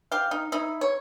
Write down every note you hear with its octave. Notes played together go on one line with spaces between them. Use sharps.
G4 F5
D#4
D#4 E4
C#5